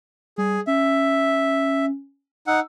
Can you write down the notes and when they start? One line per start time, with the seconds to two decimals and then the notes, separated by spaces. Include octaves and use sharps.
0.38 G3 G#4
0.67 C#4 E5
2.47 D#4 F#5 E6